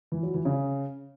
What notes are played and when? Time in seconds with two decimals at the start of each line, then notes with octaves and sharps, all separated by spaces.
0.12 E3
0.23 F#3
0.34 E3
0.45 C#3